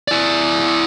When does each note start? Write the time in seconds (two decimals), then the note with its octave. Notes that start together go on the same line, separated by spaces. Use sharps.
0.08 E4 D5